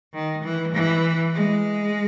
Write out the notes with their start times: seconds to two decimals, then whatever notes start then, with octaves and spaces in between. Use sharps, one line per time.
0.14 D#3
0.44 E3
0.75 E3
1.34 G#3